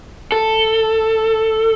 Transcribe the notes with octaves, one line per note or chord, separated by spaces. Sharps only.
A4